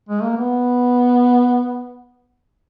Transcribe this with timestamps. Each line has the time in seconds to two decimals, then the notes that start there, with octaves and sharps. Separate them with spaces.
0.09 G#3
0.23 A#3
0.37 B3